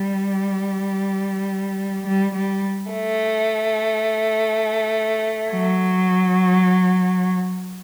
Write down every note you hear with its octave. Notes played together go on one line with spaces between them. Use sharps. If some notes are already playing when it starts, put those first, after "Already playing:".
Already playing: G3
G3
G3
A3
F#3